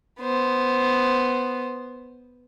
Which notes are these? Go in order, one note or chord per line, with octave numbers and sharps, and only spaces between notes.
B3 C5